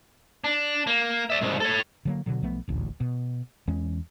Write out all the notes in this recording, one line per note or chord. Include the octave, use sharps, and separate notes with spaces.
D4
A#3
D5 E5
C2 G#2
A4 C#5
D3 F#3 A#3
B2 D3 F#3
B1 F3 A3 B3
D#1 A1 D2
B2
E2 E3 G#3 C#4